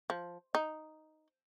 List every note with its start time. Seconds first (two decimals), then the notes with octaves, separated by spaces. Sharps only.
0.10 F3
0.55 D#4